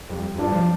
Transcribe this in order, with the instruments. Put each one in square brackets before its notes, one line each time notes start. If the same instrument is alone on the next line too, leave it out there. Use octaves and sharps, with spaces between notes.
[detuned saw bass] F2 [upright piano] G3
[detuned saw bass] F2
[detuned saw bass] G2 [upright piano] D4 F4 D5
[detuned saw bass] F3